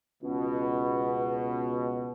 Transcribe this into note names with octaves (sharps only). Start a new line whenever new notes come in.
C#2 B2